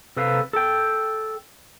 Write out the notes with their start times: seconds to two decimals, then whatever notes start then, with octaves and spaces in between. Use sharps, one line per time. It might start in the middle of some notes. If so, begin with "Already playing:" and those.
0.16 C3 A4 B4 F5
0.53 A4 G5